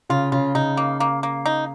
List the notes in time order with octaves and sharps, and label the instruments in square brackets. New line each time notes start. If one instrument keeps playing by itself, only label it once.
[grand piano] C#3 [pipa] F4
[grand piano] C#3 [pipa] F4
[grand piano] C#3 [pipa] D#4
[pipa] A#3
A#3
A#3
D#4